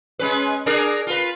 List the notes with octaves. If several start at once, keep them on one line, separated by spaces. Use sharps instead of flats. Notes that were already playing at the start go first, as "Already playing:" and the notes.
G#3 C#4 B4
D4 G#4 A#4
F4 B4